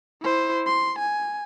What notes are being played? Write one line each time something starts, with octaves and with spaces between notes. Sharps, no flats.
E4 C5
C6
G#5